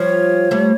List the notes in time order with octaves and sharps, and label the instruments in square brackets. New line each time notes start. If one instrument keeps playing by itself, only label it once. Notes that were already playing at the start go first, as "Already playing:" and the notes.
Already playing: [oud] F3 G3 [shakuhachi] C#5
[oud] G3 A3